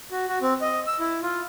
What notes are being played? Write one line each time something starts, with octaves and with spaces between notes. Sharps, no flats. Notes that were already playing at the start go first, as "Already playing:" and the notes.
F#4
F#4
C4
D#5
E6
E4
F4